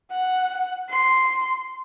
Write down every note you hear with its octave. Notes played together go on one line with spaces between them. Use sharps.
F#5
C6